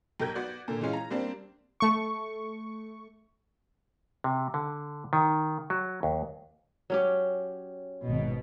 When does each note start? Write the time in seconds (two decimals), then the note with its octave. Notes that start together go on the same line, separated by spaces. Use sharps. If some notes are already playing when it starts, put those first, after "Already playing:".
0.20 B1 G4 A#4 G6 G#6
0.35 B3 F#4 D5
0.68 A#2 D3
0.81 E3 G#3 C#4 F4
0.93 A#5
1.10 G3 A#3 C4 D4
1.80 A3 C#6
4.24 C3
4.54 D3
5.13 D#3
5.70 F#3
6.03 D#2
6.90 F#3 C#4 G4
8.07 G#1 B2